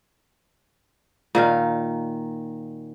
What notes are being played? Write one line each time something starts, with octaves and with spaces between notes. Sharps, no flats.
A#2 D#3 F5